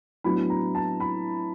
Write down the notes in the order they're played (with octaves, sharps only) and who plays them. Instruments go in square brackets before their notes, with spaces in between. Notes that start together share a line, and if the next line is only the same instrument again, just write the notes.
[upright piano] A2 F#3 B3 D4 B5
A#5
A5
B5